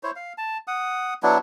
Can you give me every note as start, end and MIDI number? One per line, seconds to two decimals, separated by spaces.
0.03 0.11 64
0.03 0.11 72
0.03 0.11 73
0.16 0.33 77
0.38 0.58 81
0.67 1.14 78
0.67 1.14 87
1.23 1.38 54
1.23 1.38 59
1.23 1.38 62
1.23 1.38 64